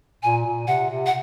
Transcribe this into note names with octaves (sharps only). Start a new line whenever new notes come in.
A#2 G#5
A#2
C3 F#5
C3
F#5